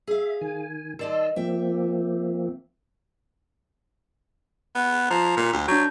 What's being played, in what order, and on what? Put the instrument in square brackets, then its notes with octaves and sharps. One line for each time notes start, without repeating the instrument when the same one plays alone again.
[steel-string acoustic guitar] G#4 F5 [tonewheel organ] E5
[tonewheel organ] D#3 G#5
[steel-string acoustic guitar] D#3 D5 D#5 [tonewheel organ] A5 C6 E6
[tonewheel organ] F3 A#3 C4 [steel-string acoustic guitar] E5 G5
[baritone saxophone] B3
[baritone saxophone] F3 [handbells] A#5
[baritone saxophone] A#2
D2
[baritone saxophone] F#3 [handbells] D4 G6